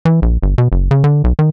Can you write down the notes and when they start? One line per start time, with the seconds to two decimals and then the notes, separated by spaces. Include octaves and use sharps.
0.05 E3
0.22 A#1
0.42 G1
0.58 B2
0.72 F#1
0.91 C#3
1.04 D3
1.24 B1
1.39 D#3